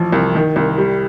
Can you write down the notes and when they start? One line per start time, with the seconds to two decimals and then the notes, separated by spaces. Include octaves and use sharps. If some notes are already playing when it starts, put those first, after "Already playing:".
Already playing: A1 F3
0.12 C2
0.35 D#3
0.56 C2
0.78 G3